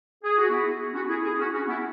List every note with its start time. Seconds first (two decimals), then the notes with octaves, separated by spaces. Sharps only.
0.24 G#4
0.38 F#4
0.50 B3 E4
0.94 C#4 F#4
1.09 E4 G#4
1.24 E4 G#4
1.39 C#4 F#4
1.53 C#4 F#4
1.68 B3 E4